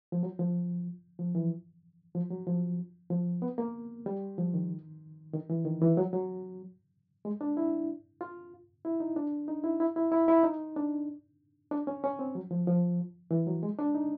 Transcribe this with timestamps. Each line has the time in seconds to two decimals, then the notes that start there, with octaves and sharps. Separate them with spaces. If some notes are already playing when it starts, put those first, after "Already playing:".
0.12 F3
0.23 F#3
0.39 F3
1.19 F3
1.35 E3
2.15 F3
2.31 F#3
2.47 F3
3.10 F3
3.42 B3
3.58 A#3
4.06 G3
4.38 F3
4.54 D#3
5.34 D#3
5.50 E3
5.65 D#3
5.82 E3
5.97 F#3
6.13 F#3
7.25 G#3
7.41 D4
7.57 E4
8.21 F4
8.85 E4
9.00 D#4
9.16 D4
9.48 D#4
9.64 E4
9.80 E4
9.96 E4
10.12 E4
10.28 E4
10.43 D#4
10.76 D4
11.71 D4
11.87 C#4
12.04 C#4
12.19 C4
12.35 F#3
12.51 F3
12.67 F3
13.31 E3
13.47 F#3
13.63 G#3
13.79 D4
13.95 D#4